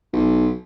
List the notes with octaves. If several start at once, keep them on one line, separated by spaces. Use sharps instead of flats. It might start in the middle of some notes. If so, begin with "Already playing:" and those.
B1